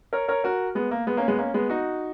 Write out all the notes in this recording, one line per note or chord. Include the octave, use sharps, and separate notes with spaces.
A#4 C#5
A#4 C#5
F#4 A#4
G#3 B3
A#3
G#3 B3
A#3 C#4
G#3 B3
A#3 C#4
G#3 B3
D#4 F#4